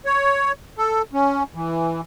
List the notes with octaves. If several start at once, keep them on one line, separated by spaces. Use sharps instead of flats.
C#5
A4
C#4
E3